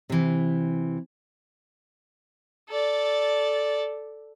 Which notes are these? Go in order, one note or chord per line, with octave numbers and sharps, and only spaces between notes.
C3 E3
A4 D5